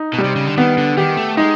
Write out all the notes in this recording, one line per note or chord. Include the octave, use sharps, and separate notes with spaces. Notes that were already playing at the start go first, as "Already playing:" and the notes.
Already playing: D#4
B2 G3
C3
C#3
D3
D#3 B3
D3
D#3 G4
A3
G#3 D#4